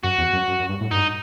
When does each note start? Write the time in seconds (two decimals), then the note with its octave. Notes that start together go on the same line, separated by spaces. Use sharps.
0.03 F#2 F#4
0.18 E2
0.33 F#2
0.47 F#2
0.59 F#2
0.69 G2
0.81 A2
0.91 G2 D#4